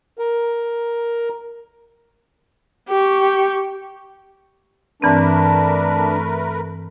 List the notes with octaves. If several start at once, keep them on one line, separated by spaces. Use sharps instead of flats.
A#4
G4 C#6
G2 E3 A3 C4 D4 A#4 B4